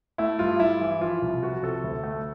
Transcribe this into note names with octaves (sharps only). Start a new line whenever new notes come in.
A3 E4
G2 F4
G2 E4
E3
F3 F4
C2
F3 F#4
C3 A4
D2
A3